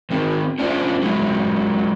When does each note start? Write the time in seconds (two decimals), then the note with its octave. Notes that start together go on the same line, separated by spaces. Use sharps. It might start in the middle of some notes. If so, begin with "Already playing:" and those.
0.10 D#3 C4
0.58 C#4 D4 F4 G#4 C5 D5
1.02 F#3 G#3 E4